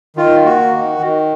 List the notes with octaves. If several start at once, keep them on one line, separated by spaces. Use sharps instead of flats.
D#3 F4
A#3 F#4
D#3
D#3